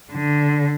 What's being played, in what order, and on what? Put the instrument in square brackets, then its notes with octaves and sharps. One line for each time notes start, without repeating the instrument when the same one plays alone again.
[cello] D3